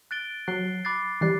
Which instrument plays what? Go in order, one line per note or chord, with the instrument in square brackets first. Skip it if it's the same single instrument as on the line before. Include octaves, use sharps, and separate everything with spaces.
[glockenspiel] F#6 A6 D7 G7
[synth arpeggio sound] F#3 [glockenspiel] F#6 C7 G7
[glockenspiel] B5 D6 F#6 A6 C7
[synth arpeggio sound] E3 G3 [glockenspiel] F#6 A6 C7